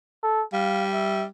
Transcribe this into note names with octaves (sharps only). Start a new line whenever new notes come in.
A4
G3 F5
E5